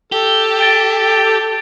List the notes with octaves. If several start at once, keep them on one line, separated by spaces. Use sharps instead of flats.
G4 A4
A6 D7 G7